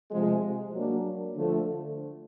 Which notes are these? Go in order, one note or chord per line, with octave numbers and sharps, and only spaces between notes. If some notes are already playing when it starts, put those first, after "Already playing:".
C3 F3 G#3
F#3 A#3 D4
D3 F3 A3